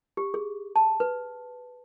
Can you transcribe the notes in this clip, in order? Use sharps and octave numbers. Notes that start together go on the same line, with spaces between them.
G4
G#4
A5
B4